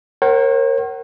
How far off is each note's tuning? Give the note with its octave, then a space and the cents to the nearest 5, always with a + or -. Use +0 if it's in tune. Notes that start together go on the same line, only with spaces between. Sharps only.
A#4 +0 C#5 -45 F#5 +35